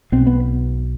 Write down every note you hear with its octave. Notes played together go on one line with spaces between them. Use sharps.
B1 B2 C4
B3